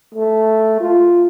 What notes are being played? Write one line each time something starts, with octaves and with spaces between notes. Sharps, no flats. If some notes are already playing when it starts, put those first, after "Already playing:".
A3
F4